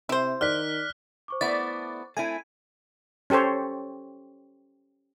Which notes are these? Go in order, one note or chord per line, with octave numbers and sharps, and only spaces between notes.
C3 E4 C5
D#3 D5 F6 F#6 B6
C5 C#6 D6
A3 B3 E4 D5
A3 C4 E4 G#5
C#4 G4 A4 C5 C#5